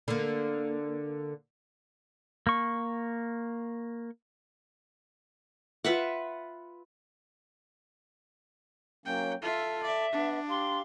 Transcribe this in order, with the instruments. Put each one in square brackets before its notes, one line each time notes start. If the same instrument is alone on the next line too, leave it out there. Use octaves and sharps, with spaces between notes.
[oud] D3 A#3
[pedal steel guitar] A#3 C#6
[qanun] F4 B4 E5 F#5
[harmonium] F#3 A#3 C#4 [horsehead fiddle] G5
[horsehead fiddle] F4 E5 [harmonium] A4
[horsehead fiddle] D5 [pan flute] E5
[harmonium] B3 [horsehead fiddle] D4
[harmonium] G4 F5 [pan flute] C6